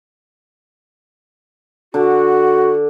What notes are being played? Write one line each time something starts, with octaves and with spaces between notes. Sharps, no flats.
D3 F#4